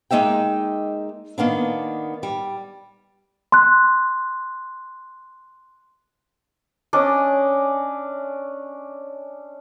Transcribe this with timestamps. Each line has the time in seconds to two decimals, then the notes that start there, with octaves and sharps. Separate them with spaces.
0.11 G#3 A#3 D#4 E5 G5
1.38 D#3 A#3 B3 D4
2.23 G3
3.52 C6 F#6
6.93 C#4 D4 D5 D#5